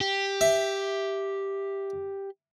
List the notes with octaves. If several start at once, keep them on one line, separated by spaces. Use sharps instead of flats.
G4
E5